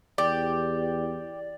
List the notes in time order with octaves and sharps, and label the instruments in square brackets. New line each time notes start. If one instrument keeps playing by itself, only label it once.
[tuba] E2 [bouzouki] G4 [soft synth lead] D5